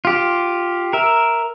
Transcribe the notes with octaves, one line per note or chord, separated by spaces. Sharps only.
F4 G4
A#4 E5